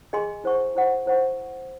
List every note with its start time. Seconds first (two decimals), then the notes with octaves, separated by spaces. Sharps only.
0.13 G#4 D#5 G#5 C6
0.44 E4 C5 F#5 C#6
0.75 E4 C5 F#5 C#6
1.06 E4 C5 F#5 C#6